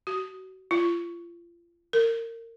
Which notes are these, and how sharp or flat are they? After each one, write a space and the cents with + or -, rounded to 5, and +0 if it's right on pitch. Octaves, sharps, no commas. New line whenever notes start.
F#4 +30
F4 -30
A#4 -25